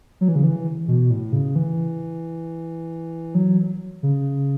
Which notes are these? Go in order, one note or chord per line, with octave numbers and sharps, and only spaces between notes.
F#3
E3
C#3
E3
B2
A2
C#3
E3
F#3
C#3